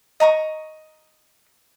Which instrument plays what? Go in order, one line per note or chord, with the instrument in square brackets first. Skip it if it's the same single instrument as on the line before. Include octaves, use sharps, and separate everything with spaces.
[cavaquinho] D#5 A#5 C#6 D#6